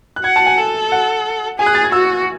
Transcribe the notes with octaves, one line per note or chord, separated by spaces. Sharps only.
F#6
F#5 G#6
A5
G#5
A4
F#5
G#4 G#5
F#6
A6
G#6
F#4 E6